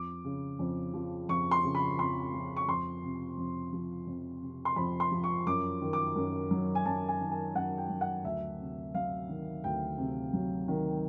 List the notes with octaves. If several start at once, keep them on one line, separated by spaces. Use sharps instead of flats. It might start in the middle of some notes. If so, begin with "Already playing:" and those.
Already playing: F2 D6
C#3
F2
F3
F2 C#6
C6
C#3
B5
F2 C6
F3
C#6
F2 C6
C3
F2
F3
F2
C3
C6
F2 B5
C6
F3
C#6
F#2 D6
D#3
D6
F#2
F#3
G#5
F#2 A5
G#5
D#3
G#5
F#2 F#5
G5
F#3
F#5
D2 E5
C3
F#3 F5
D#3
D2 G5
C3
F#3
D#3